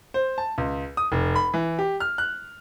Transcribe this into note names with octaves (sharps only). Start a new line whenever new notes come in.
C5
A5
C#2
D#6
F1
B5
E3
G4
F6
F#6